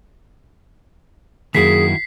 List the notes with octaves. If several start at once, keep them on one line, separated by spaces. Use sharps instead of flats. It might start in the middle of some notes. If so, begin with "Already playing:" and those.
F#2 D#3 A#3 E4 F#4 G#4 B6 C7